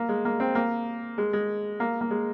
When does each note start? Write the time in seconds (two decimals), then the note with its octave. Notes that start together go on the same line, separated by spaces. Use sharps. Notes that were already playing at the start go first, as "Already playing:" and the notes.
Already playing: A#3
0.09 G#3
0.25 A#3
0.40 C4
0.55 A#3
1.18 G#3
1.33 G#3
1.80 A#3
2.01 A#3
2.11 G#3